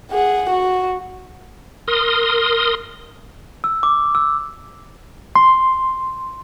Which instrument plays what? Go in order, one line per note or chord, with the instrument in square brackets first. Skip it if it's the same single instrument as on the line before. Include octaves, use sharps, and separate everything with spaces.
[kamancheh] G#4 F#5
F#4
[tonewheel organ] A#4 C6 D#6
[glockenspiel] E6
D6
E6
[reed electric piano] C6